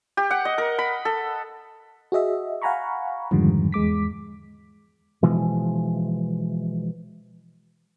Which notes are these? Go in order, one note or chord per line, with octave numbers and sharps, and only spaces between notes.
G4
F#5
D#5
A#4
B5
A4
F#4 G#4 D#5 E5
F5 F#5 G#5 A#5 B5 C#6
F2 G#2 D3 D#3 F3 G3
E2 G#3 D6 B6
B2 E3 F3 G#3